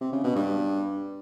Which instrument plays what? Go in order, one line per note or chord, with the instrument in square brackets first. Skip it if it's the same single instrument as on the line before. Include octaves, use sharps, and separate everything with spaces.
[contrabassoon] C3
C#3
B2
G2